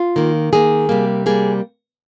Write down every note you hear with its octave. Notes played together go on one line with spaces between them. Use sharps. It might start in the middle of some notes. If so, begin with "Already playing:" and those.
Already playing: F4
D#3 A#3
D#3 A#3 G#4
C3 G3 A#3
C3 G3 A#3 G#4